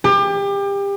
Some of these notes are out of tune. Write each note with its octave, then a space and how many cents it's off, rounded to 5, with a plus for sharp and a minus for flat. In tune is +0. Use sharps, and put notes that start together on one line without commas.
G4 +30